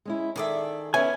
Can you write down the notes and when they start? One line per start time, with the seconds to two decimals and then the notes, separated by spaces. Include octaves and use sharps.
0.05 G#3 C#4 E4
0.36 D#3 G#4 A4 D5 E5
0.94 B3 C#4 E4 G#5